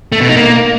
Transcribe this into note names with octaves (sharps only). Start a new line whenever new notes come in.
A3
B2
D#4
A#3